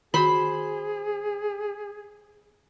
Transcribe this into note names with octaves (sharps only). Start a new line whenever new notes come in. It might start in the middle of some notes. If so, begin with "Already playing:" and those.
D#3 F#4 G#4 C5 B5